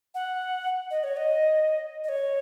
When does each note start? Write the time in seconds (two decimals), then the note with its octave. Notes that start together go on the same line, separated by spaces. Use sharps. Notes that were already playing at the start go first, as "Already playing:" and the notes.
0.15 F#5
0.91 D#5
1.04 C#5
1.17 D#5
2.04 D#5
2.09 C#5